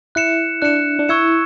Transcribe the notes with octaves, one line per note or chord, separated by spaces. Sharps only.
E4 F#6 C#7 E7
D4 F#6 C#7 E7
D4
E4 C#6 E6 G#6 C#7 E7